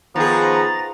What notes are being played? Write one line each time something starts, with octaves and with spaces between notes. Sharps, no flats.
D#3 F3 B3 G#4 A#5 A6